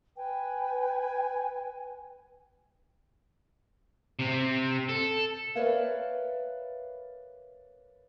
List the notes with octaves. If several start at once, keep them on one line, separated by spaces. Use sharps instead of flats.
B4 G5 G#5
C3 C4
A4
A#4 B4 C#5 D5 E5 F5